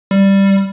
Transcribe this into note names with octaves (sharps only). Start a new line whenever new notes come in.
G3